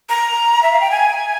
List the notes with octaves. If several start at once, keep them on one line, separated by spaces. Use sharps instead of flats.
A#5
E5
F5
G5
G#5